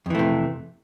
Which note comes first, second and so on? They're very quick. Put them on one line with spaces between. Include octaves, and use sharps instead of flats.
F2 E3 A3 C3